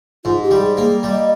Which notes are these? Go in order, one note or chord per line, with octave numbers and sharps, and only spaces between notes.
G#2 F4
G4
G3
G#4
A#3 G#4
G3
D#5